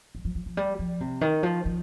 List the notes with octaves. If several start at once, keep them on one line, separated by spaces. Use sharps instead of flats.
F3
F3
F3
F3
G3
F3
C3
D#3
F3
F3